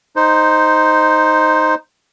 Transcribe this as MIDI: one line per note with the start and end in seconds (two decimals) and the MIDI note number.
0.16 1.75 63
0.16 1.75 72